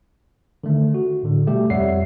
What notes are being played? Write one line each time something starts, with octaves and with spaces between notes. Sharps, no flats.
D3 D#3 A3
F#4
A2 D3
B2 G3 A3 G4
F2 G3 C#5 E5 F#5 C7